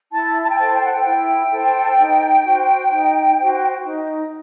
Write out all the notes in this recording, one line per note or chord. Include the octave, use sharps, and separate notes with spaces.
E4 A5
A5
G5
A4 C5 A5
G5
F#5
G5
E4 G5
A4 C5
D#4
F#4 C5
D#4
F#4 C5
D#4